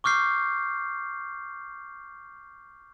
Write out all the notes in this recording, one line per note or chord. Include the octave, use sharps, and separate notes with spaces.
C#6 D6 F6 G6 C7